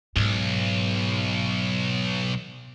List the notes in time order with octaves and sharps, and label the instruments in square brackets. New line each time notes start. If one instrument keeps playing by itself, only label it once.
[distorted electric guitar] B1 [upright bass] G#2